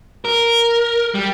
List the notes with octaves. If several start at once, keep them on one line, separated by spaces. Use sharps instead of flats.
A#4
G3